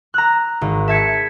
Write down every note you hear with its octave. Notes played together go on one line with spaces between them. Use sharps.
A#5 E6 F#6
G#1
E5 A5 G#6 B6 C#7